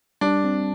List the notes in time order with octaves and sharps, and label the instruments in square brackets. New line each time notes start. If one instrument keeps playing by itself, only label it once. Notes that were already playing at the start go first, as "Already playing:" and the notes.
[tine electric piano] G3 [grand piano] D4
[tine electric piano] C4